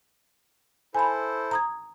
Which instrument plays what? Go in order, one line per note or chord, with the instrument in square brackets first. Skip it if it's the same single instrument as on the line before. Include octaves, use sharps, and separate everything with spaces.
[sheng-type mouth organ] E4 A4 C5 [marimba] G#5 B5
[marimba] A#5 D#6 G#6